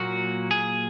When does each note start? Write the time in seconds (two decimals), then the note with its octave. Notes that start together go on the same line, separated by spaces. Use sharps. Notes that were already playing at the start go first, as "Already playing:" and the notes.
Already playing: A#2 F#3 A#3 F#4
0.51 G#4